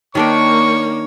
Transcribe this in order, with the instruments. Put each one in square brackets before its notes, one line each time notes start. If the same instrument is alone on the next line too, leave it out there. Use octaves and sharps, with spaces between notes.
[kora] D#3 D4 G5 [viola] A#3 [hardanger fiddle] C#5 [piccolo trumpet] C#6